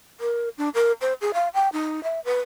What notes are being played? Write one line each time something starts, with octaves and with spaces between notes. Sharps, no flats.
A#4
D4
A#4
C5
G#4
F5
G5
D#4
E5
B4